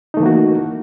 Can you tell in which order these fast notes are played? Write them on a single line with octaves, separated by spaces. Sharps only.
D#4 A3 E3 A#3 F#4